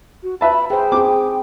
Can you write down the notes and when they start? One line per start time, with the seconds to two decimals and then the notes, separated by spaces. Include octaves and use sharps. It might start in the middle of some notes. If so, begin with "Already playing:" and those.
0.23 F#4
0.41 B4 E5 A5 B5
0.70 G#4 C5 G5
0.92 C4 G#4 D6